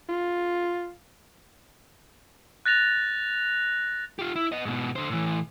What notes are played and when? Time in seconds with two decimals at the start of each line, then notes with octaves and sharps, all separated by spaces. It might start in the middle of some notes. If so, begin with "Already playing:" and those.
0.09 F4
2.66 F#6 A6 A#6 F7
4.19 F4 G4
4.36 E4
4.52 B3 D#5
4.65 G#2 B2
4.96 D3 C5
5.10 A2 E3